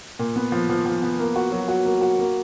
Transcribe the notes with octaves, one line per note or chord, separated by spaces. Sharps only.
A#2
B3
F3
F3
F3
B3
A#3
F#4
F#3
F#4
A#3
F#4
A#3